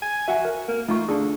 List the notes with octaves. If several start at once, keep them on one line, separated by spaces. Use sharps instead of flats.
G#5
F#4 E5 F#5 G#5
A#4
A#3
A3 D#4 F4 C#6
D3 D4 G#4